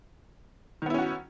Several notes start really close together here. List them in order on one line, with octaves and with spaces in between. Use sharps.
D#3 B3 E4 C#4 F#4